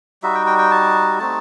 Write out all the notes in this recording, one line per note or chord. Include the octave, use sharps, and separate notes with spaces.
G3 D#4 F#4 E5
G5
G5
G5
A5
A3 C4 D#4 A5